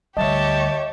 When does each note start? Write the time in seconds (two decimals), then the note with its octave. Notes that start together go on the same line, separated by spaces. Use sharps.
0.17 D2 G3 G4 C#5 D#5 E5 A5